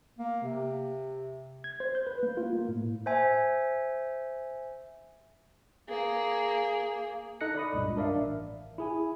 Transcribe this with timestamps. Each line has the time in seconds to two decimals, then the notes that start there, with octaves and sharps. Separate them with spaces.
0.19 A#3
0.43 C3
1.64 G#6
1.80 C5
1.95 G6
2.07 B4
2.23 A#3
2.37 F4
2.53 A#3
2.68 A2
3.06 C5 E5 G#5
5.89 A#3 G#4
7.41 D#4 A4 D#5 F#6 A#6 C#7
7.55 D5 D#5 B5 D#6
7.73 C#2 G2 A#2
7.96 D4 A#4 D5 E5 F5
8.14 A1
8.78 E4 G#4 G#5